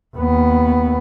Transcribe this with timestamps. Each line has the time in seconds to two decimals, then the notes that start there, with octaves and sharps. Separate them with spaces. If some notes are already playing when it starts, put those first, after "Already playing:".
0.17 D#2 B3